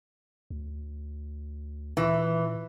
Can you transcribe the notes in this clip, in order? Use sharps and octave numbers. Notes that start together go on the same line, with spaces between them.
D2
A#2 E3